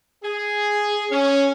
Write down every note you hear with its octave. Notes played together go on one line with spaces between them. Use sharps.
G#4
C#4